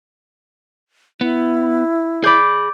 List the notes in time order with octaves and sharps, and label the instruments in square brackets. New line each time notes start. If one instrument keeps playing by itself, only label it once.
[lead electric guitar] B3 [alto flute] E4
[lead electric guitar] G#4 B5 [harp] D5 D6 G6